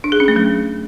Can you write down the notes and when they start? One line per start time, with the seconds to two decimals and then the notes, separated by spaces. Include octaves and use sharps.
0.04 D4
0.12 G#4
0.20 C#4
0.28 A3
0.36 F#3